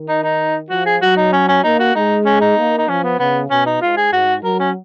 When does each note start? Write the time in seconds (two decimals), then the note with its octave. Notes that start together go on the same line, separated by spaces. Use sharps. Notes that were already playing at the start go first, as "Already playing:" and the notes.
Already playing: D#3
0.08 D#4
0.23 D#4
0.70 F3 F#4
0.86 G#4
1.02 F#3 F#4
1.17 D#4
1.33 C#4
1.48 C#4
1.64 A#3 D#4
1.80 F#4
1.95 G#3 D#4
2.25 C#4
2.41 D#4
2.58 A#3
2.78 D#4
2.88 F3 C#4
3.04 B3
3.19 C#3 B3
3.50 B2 C#4
3.66 D#4
3.81 G#2 F4
3.97 G#4
4.12 G#2 F#4
4.43 F#3 A#4
4.59 C#4